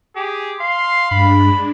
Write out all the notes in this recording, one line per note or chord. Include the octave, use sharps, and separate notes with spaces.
G4 G#4
F5 C6
G2 G#3 D4 B5